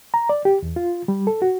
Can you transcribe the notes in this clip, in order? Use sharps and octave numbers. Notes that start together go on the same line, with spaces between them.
A#5
D5
G4
E2
F4
G3
A4
F#4